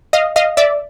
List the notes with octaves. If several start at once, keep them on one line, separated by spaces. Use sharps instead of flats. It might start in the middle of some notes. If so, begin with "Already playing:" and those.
D#5 F5
D#5 F5
D5 E5